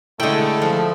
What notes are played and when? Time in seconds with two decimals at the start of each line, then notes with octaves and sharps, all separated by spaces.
0.20 D3 G#3 A3 E4 G5
0.62 F3